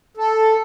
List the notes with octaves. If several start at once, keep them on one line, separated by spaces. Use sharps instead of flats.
A4